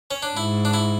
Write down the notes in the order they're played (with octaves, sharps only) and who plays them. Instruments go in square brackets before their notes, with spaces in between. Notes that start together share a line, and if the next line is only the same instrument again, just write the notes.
[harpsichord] C#4
D4
[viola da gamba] G#2 [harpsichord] E4
[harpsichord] D4
E4